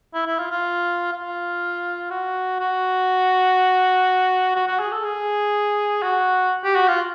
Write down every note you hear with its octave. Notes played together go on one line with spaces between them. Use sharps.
E4
E4
F4
F4
F4
F#4
F#4
F#4
F#4
G#4
A4
G#4
F#4
G4
F#4
F4